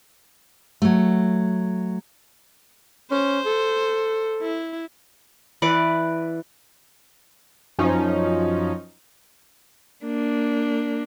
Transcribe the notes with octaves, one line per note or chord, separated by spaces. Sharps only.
F#3 A3
C#4 C5
A4
E4
E3 B4 D5 F#5
F#2 F3 C#4 D#4
A#3 D4